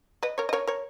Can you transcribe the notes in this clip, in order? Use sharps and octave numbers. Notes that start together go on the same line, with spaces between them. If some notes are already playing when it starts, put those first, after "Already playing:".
B4 D#5
A#4 C#5
D#5
A#4 C#5
A#4 C#5